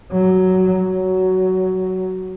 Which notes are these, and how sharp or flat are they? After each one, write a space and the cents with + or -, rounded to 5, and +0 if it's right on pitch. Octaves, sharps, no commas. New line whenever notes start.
F#3 +10
F#3 +15